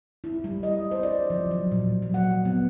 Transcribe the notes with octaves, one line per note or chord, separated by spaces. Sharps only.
E4
G3
D#5
C5
D5
F3
F#3
A#2
F#3
F#5
B3